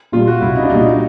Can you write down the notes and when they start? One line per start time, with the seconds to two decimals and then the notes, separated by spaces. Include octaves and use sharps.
0.12 A#2 G3 F4
0.27 F#4
0.41 C2 E4
0.56 D#4
0.63 D4
0.69 G3 D#4
0.74 A#2
0.88 D#4